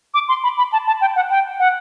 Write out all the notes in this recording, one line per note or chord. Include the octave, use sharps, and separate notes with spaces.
D6
C6
B5
B5
A5
A5
G5
F#5
G5
F#5